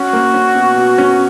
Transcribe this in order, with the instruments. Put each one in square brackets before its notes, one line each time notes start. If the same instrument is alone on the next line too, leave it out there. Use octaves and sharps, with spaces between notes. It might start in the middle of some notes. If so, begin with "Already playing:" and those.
Already playing: [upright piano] C#4 [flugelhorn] F#4
[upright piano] A#3
C#4
B2
B2
C#4